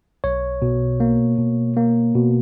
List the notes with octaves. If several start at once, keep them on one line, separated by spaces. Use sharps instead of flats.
B1 C#5
B2
A#3
B2
A#3
B2